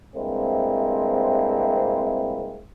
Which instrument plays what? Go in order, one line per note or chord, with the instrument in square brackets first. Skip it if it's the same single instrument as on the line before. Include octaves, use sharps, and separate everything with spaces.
[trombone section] G2 C3 G#3 A#3 C4 E4